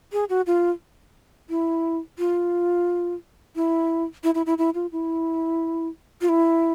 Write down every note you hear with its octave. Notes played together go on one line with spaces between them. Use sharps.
G#4
F#4
F4
E4
F4
E4
E4
E4
E4
E4
F4
E4
F4
E4